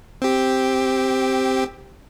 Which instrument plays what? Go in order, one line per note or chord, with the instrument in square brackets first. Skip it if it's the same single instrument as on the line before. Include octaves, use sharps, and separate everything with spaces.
[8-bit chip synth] C4 G4